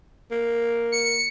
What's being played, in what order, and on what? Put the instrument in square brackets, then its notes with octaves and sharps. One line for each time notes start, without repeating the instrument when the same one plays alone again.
[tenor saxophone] A#3
[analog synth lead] C#7